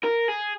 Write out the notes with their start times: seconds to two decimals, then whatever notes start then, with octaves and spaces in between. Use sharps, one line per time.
0.03 A#4
0.28 G#4